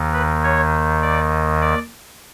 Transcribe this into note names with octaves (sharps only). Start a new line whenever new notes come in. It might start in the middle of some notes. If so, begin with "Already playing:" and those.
Already playing: D#2 D#3
B4
C#5
D5
D5